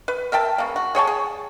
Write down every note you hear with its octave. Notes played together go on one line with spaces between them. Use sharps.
B4
A#4 E5 G5 A5
C#3 A#3
F#4
G#4 C#5 G5 A5
G#4